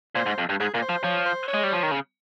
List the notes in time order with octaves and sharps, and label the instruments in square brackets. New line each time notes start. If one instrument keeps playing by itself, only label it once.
[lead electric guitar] A#2 [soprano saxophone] C5
[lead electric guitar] G#2
F2
G2
[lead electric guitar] G#2 [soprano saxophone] G#4
[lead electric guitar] A#2 [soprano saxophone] A#4
[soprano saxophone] C5
[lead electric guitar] F3
[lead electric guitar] F3 [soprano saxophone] C#5
[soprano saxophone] C5
C#5
[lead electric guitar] G#3
G3
F3
D#3
C#3